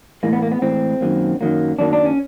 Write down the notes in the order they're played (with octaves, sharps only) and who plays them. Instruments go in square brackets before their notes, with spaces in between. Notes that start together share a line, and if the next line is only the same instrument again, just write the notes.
[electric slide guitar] A2 E3 G#3 A#3
B3
A#3
B3
A2 E3 G#3 C4
F#2 D#3 F#3 A#3
F#2 D#3 F#3 A#3
F#2 D#3 F#3 A#3 D4
D4
C#4